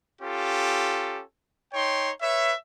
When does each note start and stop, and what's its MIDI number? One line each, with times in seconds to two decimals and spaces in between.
0.21 1.23 61
0.21 1.23 65
0.21 1.23 67
0.21 1.23 69
1.73 2.09 63
1.73 2.09 73
1.73 2.09 79
1.73 2.09 84
2.22 2.53 71
2.22 2.53 73
2.22 2.53 76